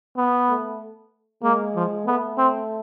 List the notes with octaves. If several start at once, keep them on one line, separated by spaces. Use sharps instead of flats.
B3
A3
G#3 A#3
F3
A3 B3
C4